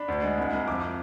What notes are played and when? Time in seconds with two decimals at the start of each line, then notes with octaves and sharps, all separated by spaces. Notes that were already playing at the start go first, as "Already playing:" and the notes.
Already playing: D4 B5
0.08 D2
0.23 G#3
0.38 C2
0.53 C2
0.67 F2 D6